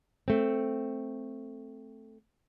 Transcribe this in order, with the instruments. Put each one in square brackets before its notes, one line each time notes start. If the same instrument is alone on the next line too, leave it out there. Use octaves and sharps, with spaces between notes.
[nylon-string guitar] A3 C4